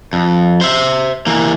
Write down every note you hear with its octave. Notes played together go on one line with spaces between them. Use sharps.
F2
C5 E5
E3 A#3